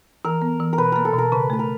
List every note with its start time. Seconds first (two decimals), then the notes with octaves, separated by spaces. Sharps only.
0.25 E3 A#4
0.42 B3
0.60 E3
0.73 A#4
0.78 B2 B4
0.92 A#3 A#4
1.05 A4
1.14 B2 A#4
1.32 C#3 B4
1.50 A3 B4
1.59 A#4